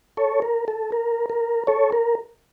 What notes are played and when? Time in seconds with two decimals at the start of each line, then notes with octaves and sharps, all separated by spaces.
0.17 A4 C#5
0.42 A#4
0.68 A4
0.92 A#4
1.30 A#4
1.67 A4 C#5
1.92 A#4